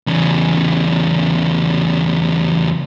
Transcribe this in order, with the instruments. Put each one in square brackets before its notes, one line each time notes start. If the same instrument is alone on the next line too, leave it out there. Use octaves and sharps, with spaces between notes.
[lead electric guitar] E2 C#3